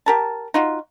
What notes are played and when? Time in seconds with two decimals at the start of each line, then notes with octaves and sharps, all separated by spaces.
0.06 G4 A#4 A5
0.54 D#4 F4 F#4